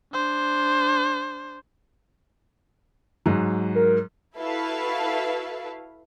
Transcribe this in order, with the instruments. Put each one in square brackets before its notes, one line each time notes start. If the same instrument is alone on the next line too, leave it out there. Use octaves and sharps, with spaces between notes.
[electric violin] D4 C5
[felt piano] G#2 F#3
[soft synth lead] A#4
[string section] E4 F#4 A4 B4 E5 F5